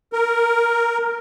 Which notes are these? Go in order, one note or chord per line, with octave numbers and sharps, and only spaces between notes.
A#4